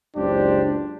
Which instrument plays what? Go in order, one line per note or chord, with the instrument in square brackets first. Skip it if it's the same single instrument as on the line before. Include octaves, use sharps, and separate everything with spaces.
[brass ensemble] F#1 C#2 D4 G4 C5